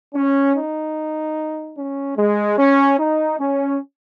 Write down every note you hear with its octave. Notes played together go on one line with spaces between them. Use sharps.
C#4
D#4
C#4
G#3
C#4
D#4
C#4